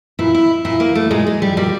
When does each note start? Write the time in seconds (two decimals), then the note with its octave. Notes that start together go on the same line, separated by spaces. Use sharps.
0.19 A#2 E4
0.35 E4
0.65 A#2 E4
0.80 A#3
0.95 A3
1.11 A#2 G#3
1.27 G#3
1.42 G3
1.57 A#2 G3